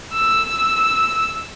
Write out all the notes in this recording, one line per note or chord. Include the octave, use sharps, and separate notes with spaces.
E6